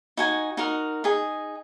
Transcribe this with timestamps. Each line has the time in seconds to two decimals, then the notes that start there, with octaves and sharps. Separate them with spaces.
0.17 D#4 F#4 G#5
0.57 D#4 F#4 A#4
1.04 D#4 G#4